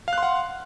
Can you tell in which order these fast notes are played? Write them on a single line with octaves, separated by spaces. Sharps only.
F5 F#6 C6 F#5